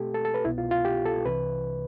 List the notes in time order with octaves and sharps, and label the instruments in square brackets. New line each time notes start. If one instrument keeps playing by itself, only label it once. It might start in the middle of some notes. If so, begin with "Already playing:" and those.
Already playing: [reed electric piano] B2 A3 C4 G4 A4
A4
A4
B4
C2 B2 B3 E4
F4
F4
G4
A4
C2 C3 E3 B4